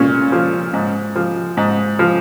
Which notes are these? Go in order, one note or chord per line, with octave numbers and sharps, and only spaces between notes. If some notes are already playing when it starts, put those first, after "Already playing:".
Already playing: A#2 C#4
F3
G#2
F3
G#2
F3